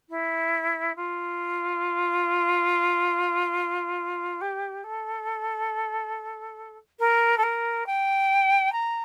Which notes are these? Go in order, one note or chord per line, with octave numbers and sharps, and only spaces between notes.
E4
F4
G4
A4
A#4
A4
A#4
G5
A#5